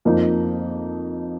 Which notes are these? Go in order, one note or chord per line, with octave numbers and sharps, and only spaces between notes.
F2 F3 A#3 D#4